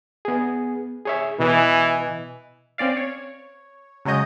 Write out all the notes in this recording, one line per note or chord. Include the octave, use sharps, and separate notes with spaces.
B3 G#4
G#4 C#5 E5
B2 E3 D#5 G#5
C4 C#4 D5 F5
C#5
C#3 F#3 G#3 C#5 D#5 G6